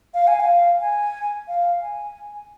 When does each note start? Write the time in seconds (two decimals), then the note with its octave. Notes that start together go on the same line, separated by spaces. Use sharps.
0.14 F5
0.27 G#5
0.40 F5
0.81 G#5
1.48 F5
1.82 G#5